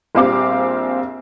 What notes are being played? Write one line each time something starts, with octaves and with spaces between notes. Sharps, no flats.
A#1 G3 C4 F5 D6